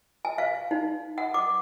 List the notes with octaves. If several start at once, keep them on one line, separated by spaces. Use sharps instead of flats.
G#5
F5
D#4
F#5
D6